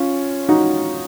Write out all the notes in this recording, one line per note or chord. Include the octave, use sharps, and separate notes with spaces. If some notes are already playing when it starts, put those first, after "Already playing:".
Already playing: C#4 F4
D#4 F#4